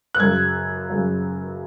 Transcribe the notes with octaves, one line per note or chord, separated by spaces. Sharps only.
F#6
F#2 C#3 F#3 G#6
F#2 C#3 F#3